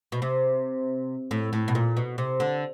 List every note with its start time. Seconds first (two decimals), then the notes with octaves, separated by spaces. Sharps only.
0.12 B2
0.22 C3
1.31 A2
1.53 A2
1.68 B2
1.75 A#2
1.97 B2
2.18 C3
2.40 D3